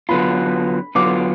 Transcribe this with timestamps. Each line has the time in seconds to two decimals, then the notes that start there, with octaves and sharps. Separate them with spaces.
0.09 D3 F#3 B3 F4 B5
0.95 D3 F#3 B3 F4 D6